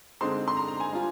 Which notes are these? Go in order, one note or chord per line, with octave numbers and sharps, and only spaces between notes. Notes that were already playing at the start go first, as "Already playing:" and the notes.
D3 G#3 C4 D#4 C6
C6
A#5
A#5
G#5
G3 D4 F4